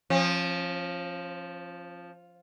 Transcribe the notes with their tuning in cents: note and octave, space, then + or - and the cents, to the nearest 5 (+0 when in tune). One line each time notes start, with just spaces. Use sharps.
F3 +0 C#4 -45